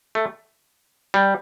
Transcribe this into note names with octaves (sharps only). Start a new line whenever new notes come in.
A3
G3